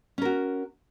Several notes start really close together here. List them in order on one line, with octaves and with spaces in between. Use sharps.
C#4 A#4 F#4